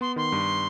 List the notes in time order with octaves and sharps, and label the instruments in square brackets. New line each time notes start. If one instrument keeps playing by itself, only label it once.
[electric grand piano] B3 [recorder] C6
[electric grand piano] D#3 [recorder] C6
[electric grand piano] G2